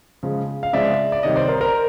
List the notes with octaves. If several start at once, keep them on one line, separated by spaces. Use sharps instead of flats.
C#3 F3 G#3
F5
C#3 F3 G#3 D5 E5
D5
C3 D#3 G3 C#5 D#5
C5 D5
A#4 C5
A#4 C5